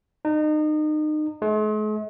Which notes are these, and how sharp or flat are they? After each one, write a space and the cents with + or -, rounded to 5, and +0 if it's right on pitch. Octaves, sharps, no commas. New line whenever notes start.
D#4 -30
G#3 +45